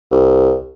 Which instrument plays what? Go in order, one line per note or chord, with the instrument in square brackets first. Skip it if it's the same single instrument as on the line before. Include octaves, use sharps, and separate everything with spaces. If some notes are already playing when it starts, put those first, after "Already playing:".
[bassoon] C2